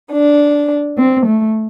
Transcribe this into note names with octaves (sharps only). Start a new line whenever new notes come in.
D4
C4
A3